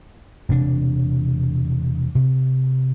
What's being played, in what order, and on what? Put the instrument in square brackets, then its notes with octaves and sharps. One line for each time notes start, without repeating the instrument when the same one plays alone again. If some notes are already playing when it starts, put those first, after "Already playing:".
[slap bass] E1 C3 D4
C3